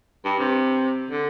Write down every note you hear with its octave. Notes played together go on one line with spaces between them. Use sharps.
G2
C3
D3